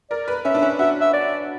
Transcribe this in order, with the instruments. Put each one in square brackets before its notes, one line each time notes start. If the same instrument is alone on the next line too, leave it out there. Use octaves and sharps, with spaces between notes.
[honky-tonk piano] A#4 [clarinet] D5
[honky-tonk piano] B4
[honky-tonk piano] C#4 [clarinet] E5
[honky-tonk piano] D4
C#4
[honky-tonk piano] F#4 [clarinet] E5
[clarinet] E5
D5